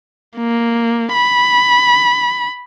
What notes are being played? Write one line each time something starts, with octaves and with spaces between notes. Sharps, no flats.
A#3
B5